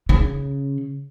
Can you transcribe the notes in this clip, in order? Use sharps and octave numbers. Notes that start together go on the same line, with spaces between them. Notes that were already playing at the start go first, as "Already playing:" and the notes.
C#3